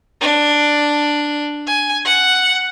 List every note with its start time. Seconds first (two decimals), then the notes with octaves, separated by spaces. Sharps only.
0.21 D4
1.67 G#5
2.05 F#5